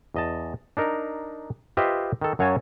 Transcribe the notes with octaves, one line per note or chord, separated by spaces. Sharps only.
E2 D#5 A5
D4 D#4 A#4
F4 G4 B4 C5 D#5 E5
D#3 A4
F#2 F#3 C#5 F5 G#5 A5